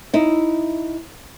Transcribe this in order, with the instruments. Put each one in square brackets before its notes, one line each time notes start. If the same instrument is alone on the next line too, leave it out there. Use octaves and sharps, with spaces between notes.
[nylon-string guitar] D#4 E4